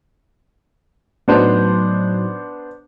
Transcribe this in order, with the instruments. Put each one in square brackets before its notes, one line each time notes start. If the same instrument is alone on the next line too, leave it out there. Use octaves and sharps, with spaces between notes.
[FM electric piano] A2 F#3 D#4 [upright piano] B3 D4 C5